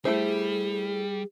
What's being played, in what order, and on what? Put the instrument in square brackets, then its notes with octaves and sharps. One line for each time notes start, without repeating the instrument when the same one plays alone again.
[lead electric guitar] G3 [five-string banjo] A3 E4 C5 [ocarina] G#4